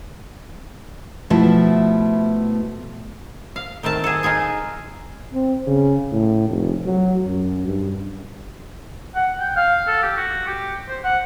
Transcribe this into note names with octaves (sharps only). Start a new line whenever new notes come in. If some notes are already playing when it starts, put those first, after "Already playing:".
B2 F3 A3 E4
F5
D#3 A3 C4 A5
G#4 A4
D#4 F4 G#4 G#5
C4
C#3
A2
F1
F#3
F#2
G2
F#5
G5
F5
A4
G4
F#4
G4
C5
F#5